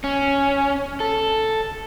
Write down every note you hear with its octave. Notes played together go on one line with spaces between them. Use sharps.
C#4
A4